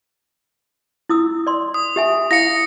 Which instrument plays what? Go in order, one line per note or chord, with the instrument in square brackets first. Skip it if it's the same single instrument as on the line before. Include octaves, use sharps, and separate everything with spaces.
[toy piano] E4 D#6 E6
D5 C6
[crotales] D#6
[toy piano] G4 E5 G#5
[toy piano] E4 F5 [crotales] A#6 C#7